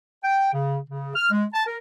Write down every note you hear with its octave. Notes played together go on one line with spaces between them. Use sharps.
G5
C#3
C#3
F6
G#3
A5
A#4